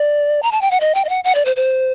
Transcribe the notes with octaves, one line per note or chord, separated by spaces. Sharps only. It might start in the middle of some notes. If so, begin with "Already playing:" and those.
Already playing: D5
A#5
A5
G5
F#5
D#5
G5
D#5
F#5
F#5
D5
C5
C5